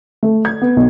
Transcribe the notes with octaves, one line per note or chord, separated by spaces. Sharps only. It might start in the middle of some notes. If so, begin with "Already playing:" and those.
A3
G#6
B3
B1